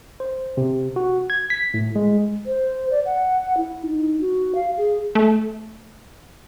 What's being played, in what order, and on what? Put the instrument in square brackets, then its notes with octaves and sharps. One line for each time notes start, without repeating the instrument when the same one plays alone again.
[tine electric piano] C5
C3
F#4
G#6
B6
A2
G#3
[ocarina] C5
D5
F#5
E4
D#4
F#4
F5
G#4
[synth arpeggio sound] A3